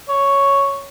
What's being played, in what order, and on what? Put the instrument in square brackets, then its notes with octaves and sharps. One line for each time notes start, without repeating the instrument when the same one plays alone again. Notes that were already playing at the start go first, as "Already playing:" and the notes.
[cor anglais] C#5